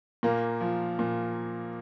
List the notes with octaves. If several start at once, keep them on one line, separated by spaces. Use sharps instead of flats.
A#2 A#3
F3
A#2